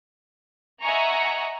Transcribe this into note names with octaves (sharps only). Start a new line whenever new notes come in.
D#5 E5 F#5 G#5 A#5 C#6